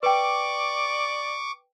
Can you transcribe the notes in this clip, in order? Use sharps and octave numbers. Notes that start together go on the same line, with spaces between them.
B4 D5 G5 C#6 D6